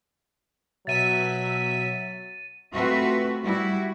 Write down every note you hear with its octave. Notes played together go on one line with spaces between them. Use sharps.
B2 F#3 E5 A6 B6 D#7
A3 C4 F4 F#4 B4 E5
G3 E4 F#4